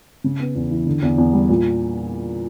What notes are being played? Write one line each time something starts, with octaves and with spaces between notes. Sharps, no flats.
C#3
B3
E2
E3
D3
E2
E2
G3
A#2